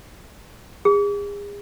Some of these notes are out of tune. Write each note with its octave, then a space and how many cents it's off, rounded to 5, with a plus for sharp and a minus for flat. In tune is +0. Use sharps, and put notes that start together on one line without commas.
G#4 -35